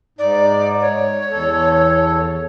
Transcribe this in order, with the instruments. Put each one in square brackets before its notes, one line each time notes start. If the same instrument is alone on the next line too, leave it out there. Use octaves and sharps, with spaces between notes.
[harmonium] G#2 D#4 [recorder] D5
[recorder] C#5
[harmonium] E2 A4